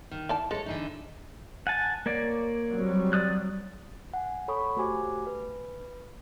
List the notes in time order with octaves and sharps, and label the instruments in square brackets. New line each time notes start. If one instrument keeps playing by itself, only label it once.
[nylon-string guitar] D#3
[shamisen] E4 D5 A5
[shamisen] G#3 [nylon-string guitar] A4 C#5
[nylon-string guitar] D3 E3 D#4
[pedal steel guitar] F#5 G#5 A5
A#3 C#5 D5
[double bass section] F#3 G3 C4
[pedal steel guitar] D5 D#6 F#6
[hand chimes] F#5 G#5
A4 C#5 B5 C#6 D#6
A3 F#4 G4 C5 G#5 D6
B4